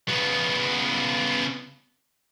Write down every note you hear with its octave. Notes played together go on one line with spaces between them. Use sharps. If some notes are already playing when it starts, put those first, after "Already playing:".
C#3 B3